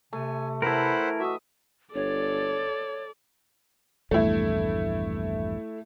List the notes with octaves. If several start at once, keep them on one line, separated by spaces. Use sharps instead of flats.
C3 A3 G#5
E3 E4 A4 A#4 C5 F#5 B5
F#4 D#5 E5 D6
G1 A4 C#5 D5
A#1 E2 G2 A3 E4